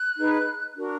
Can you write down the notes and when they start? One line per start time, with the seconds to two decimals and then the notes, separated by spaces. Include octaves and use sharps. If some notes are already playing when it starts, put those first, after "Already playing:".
Already playing: F#6
0.16 D#4 G#4 B4
0.76 D4 F#4 A#4